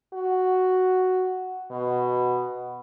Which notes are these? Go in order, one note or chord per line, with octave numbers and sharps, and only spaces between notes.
F#4
B2